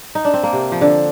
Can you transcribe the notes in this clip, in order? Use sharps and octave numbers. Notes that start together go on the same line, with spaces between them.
D#4
D4
C4
A#3
C3
F3
D3